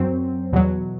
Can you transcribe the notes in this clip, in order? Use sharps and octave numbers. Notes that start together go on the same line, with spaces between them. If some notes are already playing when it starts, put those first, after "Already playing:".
Already playing: F#2 F#3 C4
E2 B2 F#3